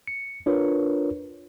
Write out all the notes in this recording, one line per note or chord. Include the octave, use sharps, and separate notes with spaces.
C#7
D4 F4 A#4 B4 C#5